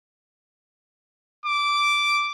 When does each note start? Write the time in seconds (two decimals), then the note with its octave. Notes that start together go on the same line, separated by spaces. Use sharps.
1.46 D6